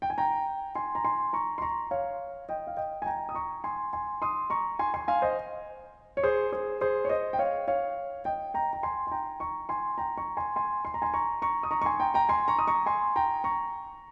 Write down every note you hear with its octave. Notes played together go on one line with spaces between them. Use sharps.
G5
G#5
G5 A#5
G#5 C6
A#5
G#5 C6
A#5 C#6
C6
A#5 C#6
C#5 F5
D#5 G5
F5
D#5 G5
G#5
G5 A#5
D#6
A#5 C#6
G#5 C6
G#5 C6
C6 D#6
A#5 C#6
G#5 C6
G#5 C6
F5 G#5
C5 D#5
C#5
G#4 C5
G#4 C5
G#4 C5
C#5
C5 D#5
G5
C#5 F5
C#5 F5
D#5 G5
G5 A#5
A#5
G#5 C6
C6
G5 A#5
A#5 C#6
G#5 C6
G5 A#5
A#5 C#6
G#5 C6
G#5 C6
C6
A#5
G#5 C6
A#5 C#6
A#5 C#6
D#6
A#5 C#6
C#6
G#5 C6
G5 A#5
G5 A#5
G#5 C6
A#5 C#6
D#6
A#5 C#6
G#5 C6
G5 A#5
A#5 C#6